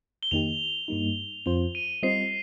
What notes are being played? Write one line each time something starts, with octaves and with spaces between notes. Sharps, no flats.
G7
F2 D#3 A#3 D#4 G4 F7
G2 G3 A#3 D#4
F2 F3 C4 F4 C5 G7
D#7
G3 C4 F4 C5 D#5 C7